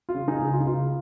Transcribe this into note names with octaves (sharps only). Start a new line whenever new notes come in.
F4
C#3
D#4 G#4
C#2
G#4
F4
D#4
C#2 F4